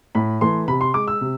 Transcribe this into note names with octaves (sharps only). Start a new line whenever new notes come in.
A2 B5
E3 A3 C6
C3 B5
C6
G#3 D6
E6
C3